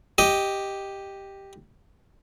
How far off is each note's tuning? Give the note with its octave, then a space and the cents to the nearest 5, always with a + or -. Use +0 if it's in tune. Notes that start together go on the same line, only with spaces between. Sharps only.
G4 +0 D#5 +0